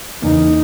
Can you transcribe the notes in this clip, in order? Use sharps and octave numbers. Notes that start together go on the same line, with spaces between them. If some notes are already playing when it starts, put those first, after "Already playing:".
E2 C#3 E3 A#3 D#4